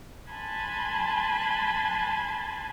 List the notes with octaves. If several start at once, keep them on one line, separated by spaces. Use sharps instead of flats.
G#5 A5 B5 C6 F#6 G#6